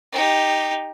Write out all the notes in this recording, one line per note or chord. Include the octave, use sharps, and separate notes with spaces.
D#4 G4